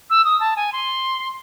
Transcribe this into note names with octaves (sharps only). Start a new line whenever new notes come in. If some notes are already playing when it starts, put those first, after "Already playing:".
E6
D#6
A5
G#5
C6